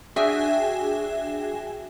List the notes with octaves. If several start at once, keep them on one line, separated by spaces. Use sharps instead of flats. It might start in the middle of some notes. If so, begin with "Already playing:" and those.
D4 F#4 G#4 E5 G5 G#5